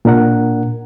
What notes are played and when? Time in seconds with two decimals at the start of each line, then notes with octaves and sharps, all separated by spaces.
0.05 A#2 D4 A#4 F#5